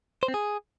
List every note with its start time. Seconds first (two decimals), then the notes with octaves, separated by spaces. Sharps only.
0.23 C5
0.28 C4
0.34 G#4